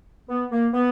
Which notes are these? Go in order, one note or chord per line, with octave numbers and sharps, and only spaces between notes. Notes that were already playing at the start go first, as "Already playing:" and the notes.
B3
A#3
B3